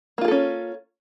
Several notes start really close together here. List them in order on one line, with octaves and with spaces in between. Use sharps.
A#3 F4 G#4 A4 C#4